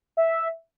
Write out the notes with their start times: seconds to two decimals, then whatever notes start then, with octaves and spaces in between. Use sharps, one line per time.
0.17 E5